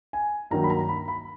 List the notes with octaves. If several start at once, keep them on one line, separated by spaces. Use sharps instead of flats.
G#5
G2 D#3 F#3 A#3 A#5
B5
A#5
B5
B5